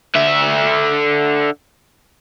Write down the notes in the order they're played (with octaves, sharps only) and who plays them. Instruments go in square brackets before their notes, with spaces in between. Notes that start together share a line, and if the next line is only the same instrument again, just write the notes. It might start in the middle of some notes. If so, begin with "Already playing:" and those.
[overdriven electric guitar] D3 E5